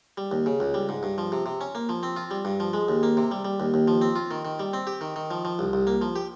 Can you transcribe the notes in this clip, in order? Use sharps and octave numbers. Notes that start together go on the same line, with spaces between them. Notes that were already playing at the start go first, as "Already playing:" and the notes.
G3
D#2
C#3
C#2
G3
G#2
G2
F3
C3
C3
C#4
A#3
F3
C4
F4
G3
G2
F3
G#3
D#2
A#3
C3
G3
G3
D#2
D#2
F3
C4
F4
D#3
D#3
G3
C4
G4
D#3
D#3
F3
F3
C2
C2
A#3
F3
G4